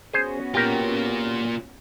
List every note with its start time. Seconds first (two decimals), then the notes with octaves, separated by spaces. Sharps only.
0.13 B3 C#4 F#4 G#4 C5
0.54 A#3 F4 G4 A#4